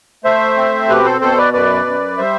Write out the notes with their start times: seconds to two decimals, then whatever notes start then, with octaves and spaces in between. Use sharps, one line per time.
0.24 A3 C5 E5
0.57 C4
0.89 B2 G4 B4
1.05 A4 C5
1.21 B2 A4 C5
1.37 B4 D5
1.53 F#2 B4 D5
1.86 F#2
2.18 G3 C5 E5